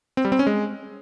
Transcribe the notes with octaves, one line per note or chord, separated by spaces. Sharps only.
C4
G3
C4
C#4
G#3